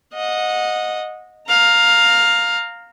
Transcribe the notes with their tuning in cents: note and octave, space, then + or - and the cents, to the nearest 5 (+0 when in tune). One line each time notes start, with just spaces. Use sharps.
D#5 +0 F#5 -25
F5 +10 A#5 -15